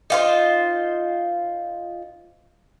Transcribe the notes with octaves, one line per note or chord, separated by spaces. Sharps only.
D#4 F4 C5